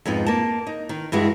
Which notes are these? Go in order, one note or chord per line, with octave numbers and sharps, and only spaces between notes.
F2 G#2 B3 D#4
A#3 A5
D#4
D#3
G2 E3 G#3 F#4